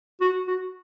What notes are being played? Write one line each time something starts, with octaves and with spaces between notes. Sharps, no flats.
F#4
F#4